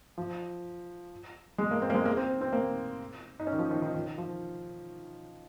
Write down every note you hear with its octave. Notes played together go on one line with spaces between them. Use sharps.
F3
G#3
A#3
C4
A#3
G#3
A#3
C4
C4
A#3
D#4
C#4
D#3
F3
D#3
D#3
D#3
F3